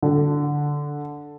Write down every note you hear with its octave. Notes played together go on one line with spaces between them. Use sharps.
D3